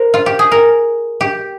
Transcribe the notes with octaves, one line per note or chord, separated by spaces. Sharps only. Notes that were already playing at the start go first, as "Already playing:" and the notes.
Already playing: A#4 C5
F4
G4
G#4
A#4
G4